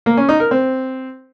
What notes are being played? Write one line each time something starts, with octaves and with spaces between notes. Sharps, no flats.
A#3
C#4
D#4
A#4
C4